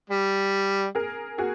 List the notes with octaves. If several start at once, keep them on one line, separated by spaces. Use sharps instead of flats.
G3
G#4 A#4
F#4 G#4